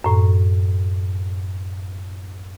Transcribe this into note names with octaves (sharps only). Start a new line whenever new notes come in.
F#2 A2